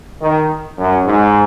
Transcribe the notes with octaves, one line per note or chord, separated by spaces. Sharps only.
D#3
F#2
G#2